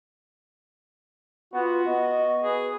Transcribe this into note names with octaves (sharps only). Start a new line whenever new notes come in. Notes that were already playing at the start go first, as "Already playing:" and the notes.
B3 F4 F#4
B3 D#5
G#4 B4